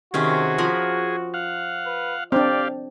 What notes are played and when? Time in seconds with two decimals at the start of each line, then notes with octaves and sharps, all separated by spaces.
0.14 C3 D#3 C#4 F#4 G#4
0.58 F3 A#4 B5
1.34 F5 F#5
1.86 B4
2.32 C4 D4 G4 D5 F5